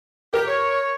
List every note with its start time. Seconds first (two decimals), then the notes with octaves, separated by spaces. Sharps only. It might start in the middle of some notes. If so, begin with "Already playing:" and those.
0.34 G4 A#4
0.47 C#5